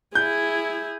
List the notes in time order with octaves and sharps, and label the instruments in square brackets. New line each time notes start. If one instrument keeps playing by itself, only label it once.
[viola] E4 G#4 [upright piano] G6